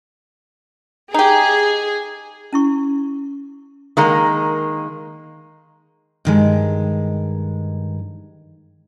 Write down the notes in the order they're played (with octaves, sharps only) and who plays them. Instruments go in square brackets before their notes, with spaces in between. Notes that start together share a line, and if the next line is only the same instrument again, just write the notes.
[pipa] D#4 G4 [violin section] G#4
[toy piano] C#4 E4 C#6
[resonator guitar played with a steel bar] D#3 G#3 A#3 [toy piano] F#5 G5 D#6
[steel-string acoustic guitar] G2 D#3 G#3